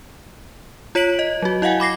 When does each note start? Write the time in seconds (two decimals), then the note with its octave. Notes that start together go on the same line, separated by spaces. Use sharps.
0.95 F4 C#5 B6 D7 F#7
1.19 D#5
1.42 F#3 F#4
1.62 E4 D#5 F5 F#5 G#5
1.80 B5 D6 A#6 C7